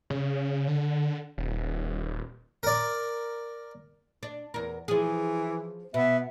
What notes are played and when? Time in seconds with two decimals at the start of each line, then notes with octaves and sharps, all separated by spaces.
0.10 C#3
0.67 D3
1.38 D#1
2.63 A#4 D5
4.23 D4
4.54 E2 A#4
4.88 E3 F3 G#4
5.94 B2 B3 E5